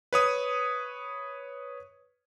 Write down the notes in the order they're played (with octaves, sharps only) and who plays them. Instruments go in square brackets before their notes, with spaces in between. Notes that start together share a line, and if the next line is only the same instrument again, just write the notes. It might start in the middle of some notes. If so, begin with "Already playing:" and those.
[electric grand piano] B4 C#5 D#6